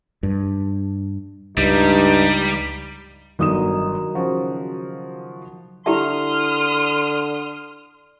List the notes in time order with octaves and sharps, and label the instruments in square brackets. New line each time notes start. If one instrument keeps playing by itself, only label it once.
[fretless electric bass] G2
[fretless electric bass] C#2 [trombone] G2 [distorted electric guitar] G3 [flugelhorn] D#4
[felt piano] G1 D#6 E7 [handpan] D#3 F#3 D#4
[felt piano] C#3 F3 F#4
[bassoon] D3 [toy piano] E4 G4 E5 [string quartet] C6 D#6 F6